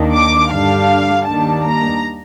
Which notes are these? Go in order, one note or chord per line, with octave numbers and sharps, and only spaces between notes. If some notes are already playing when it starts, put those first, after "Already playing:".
Already playing: D#2 D#3 A#3 D4
D6
G2 D3 G3 D4 F5
D#2 D#3 G3 A#3 D4 A5
A#5